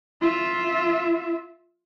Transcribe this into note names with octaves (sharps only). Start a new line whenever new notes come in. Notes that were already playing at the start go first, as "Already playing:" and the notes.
F4 E5